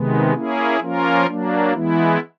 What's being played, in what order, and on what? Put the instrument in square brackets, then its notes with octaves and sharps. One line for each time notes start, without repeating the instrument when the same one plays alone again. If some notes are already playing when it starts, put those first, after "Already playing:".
Already playing: [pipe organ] C3 D#3 G#3 B3
A#3 C#4 E4 G#4
F3 A#3 C#4 F4 A#4
F#3 A#3 D4
E3 G#3 B3 E4